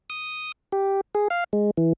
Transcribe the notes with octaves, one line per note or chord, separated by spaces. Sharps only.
D#6
G4
G#4
F5
G#3
E3